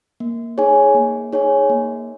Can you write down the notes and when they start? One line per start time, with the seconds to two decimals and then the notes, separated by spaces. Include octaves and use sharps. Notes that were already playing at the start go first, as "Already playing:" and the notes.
0.20 A#3
0.58 D#4 G#4 C#5 G#5
0.95 A#3
1.33 D#4 G#4 C#5 G#5
1.70 A#3